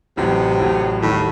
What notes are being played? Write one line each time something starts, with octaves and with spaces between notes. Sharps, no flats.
A1 A2 C3 F#3
A1 A2 F#3
D#2 A2 D#3 G3